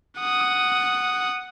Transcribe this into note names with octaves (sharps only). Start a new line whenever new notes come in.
F#5 D#6